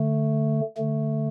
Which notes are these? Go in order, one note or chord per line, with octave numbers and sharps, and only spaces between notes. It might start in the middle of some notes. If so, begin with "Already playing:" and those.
Already playing: D3 A3
D3 A3